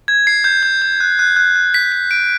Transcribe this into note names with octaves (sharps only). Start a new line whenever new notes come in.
G#6
C7
G6
G6
G6
F#6
F#6
F#6
F#6
B6
B6
D7